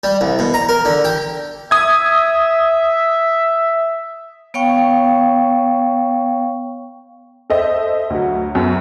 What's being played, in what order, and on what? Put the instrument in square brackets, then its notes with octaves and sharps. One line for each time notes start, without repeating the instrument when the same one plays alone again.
[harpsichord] G3
C2
B2
A#5
A#4
D3
G4
[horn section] E5 [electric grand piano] D#6 G#6
[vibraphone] B3 C#5 F5 G5 C#6
[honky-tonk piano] A4 C5 D#5 E5
D2 F#3
F#2 B3